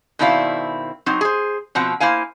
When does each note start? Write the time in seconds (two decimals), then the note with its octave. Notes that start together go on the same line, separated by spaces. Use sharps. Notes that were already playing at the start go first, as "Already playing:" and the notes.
0.19 B2 D#3 C4 E4 D5 F5
1.06 F#3 C4 D#4
1.21 G#4 C5
1.75 B2 F3 C4 F#5
2.00 A#3 E4 C5 F5 G#5